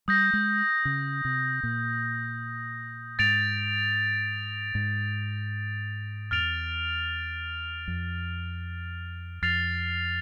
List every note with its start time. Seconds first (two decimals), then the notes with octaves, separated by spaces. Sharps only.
0.08 G3 D#6 G6 A#6
0.33 G#3
0.85 C#3
1.25 C3
1.63 A#2
3.19 G#2 A6 D7 F7
4.75 G#2
6.31 E2 F6 A6 D7 F7
7.87 F2
9.42 F2 F6 A6 C7 F7